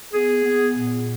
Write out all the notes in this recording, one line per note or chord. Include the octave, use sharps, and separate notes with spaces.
B3 G#4
B3
A#2